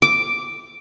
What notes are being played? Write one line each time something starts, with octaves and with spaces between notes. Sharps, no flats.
D6